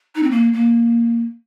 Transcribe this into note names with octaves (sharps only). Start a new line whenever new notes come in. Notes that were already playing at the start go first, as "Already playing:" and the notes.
D#4
C4
A#3
A#3